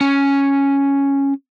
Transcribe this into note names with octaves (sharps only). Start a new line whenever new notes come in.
C#4